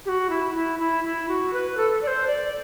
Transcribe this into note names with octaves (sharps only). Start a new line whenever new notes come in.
G4
F#4
E4
E4
E4
E4
F#4
B4
A4
D5
C5
D5